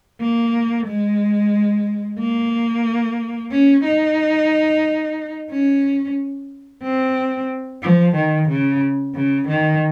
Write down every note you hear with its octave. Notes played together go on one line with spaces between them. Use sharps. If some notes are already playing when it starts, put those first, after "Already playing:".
A#3
G#3
A#3
C#4
D#4
C#4
C4
F3
D#3
C#3
C#3
D#3